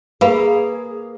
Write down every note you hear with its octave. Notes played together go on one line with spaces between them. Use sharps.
A#3 G#4 B4 F5 B5